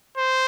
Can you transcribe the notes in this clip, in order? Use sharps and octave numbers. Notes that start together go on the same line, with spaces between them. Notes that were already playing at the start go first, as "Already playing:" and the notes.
C5